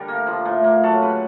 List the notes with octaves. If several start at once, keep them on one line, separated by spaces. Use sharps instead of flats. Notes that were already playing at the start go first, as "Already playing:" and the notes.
Already playing: D3 G3 A#4
A#3
F3
A2
A#3
F#3 A4
C#3 B4